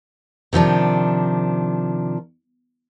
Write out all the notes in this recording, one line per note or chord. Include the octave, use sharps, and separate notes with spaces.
C3 D#3 F3 D4